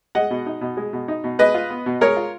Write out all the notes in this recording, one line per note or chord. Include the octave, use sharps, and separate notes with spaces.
G#3 D#5 F#5
B2
D#4
B2
G#3
B2
D#4
B2
G#3 B4 D#5
F4
B3
B2
G#3 A#4 C#5
F4